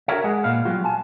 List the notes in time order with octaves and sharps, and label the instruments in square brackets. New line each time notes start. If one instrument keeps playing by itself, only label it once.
[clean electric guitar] D4 F#4 A4 A#4 C#5 E5
G#3 G#4 D#5 F#5
A#2 B4 F5
F#3 G3 B3 F4 F#4
G#5 A5